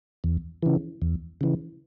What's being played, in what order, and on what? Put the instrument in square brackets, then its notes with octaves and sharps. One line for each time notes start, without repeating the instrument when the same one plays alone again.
[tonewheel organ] E2
C#3 E3
E2
C#3 E3